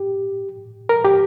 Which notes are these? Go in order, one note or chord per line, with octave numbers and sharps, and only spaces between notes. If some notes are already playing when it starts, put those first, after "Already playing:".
Already playing: G4
A#4
G4